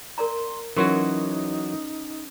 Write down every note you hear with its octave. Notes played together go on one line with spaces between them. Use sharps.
A#4 D5 A#5 C6
E3 F#3 C#4 D#4 F#4 A#4 C6 C#6